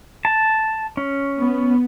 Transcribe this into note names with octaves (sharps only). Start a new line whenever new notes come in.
A5
C#4
B3